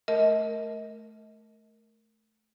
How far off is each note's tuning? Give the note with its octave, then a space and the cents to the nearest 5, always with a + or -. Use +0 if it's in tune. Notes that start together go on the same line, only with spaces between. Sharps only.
A3 -15 A#4 +0 D#5 +35